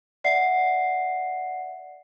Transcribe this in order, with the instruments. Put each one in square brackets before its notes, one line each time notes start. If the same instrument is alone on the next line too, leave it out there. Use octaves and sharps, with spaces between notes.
[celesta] D5 E5 F#5 C7